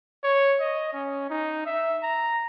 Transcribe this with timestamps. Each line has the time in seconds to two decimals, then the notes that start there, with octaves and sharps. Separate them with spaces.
0.24 C#5
0.60 D#5
0.93 C#4
1.30 D#4
1.66 E5
2.03 A#5